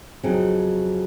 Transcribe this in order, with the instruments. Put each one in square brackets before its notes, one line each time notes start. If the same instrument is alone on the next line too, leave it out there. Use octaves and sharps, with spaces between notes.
[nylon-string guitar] F2 C#3 F#3 C4 D#4